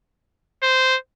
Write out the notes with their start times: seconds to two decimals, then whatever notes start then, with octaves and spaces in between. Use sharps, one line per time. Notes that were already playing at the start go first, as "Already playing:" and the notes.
0.63 C5